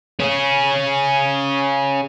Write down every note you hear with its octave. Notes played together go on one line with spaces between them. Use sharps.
C#4 G#4